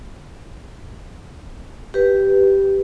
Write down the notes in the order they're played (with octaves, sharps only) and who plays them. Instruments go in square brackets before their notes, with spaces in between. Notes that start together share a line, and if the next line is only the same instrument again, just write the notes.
[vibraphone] G4 B4